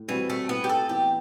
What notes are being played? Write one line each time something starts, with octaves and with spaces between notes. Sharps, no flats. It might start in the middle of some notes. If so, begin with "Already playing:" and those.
Already playing: A2
E3 G3 C4 F#4
A3
A2 B3
G4
A4
E3 B3 G4